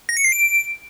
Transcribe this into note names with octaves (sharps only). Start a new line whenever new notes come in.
A#6
C#7
C7
D7